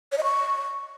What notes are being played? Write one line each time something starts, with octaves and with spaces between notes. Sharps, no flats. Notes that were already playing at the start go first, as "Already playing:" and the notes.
C#5
D#5
C#6